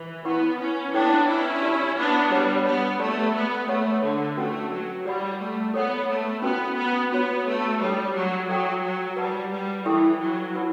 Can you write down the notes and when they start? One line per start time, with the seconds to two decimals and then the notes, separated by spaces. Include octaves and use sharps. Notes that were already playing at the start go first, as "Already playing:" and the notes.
Already playing: E3
0.25 B3 E4 B4 F#5 C#6
0.59 C#4
0.93 B3 D4 E4 A4 C#5 E5 G5
1.27 C#4 E4
1.62 G4 D5 A5 C#6
1.97 B3 D4
2.31 G3 G4 C#5 F#5 A5
2.65 B3
2.99 A3 G4 D5 A5 C#6
3.34 B3
3.68 A3 A4 C#5 F#5 C#6
4.02 D3
4.37 A3 C#4 F#4 B4 F#5
4.71 F#3
5.05 G3 G4 D5 F#5 B5
5.40 A3
5.73 B3 A4 C#5 F#5
6.08 A3
6.42 B3 C#4 F#4 B4
6.76 B3
7.11 B3 D4 F#4 C#5
7.46 A3
7.80 G3 D4 A4 C#5 E5 A5
8.14 F#3
8.49 F#3 A4 E5 G5
8.83 F#3
9.17 G3 B4 F#5 A5
9.52 G3
9.85 E3 E4 A4 E5 G5 C#6
10.20 F#3
10.55 E4 B4 F#5 B5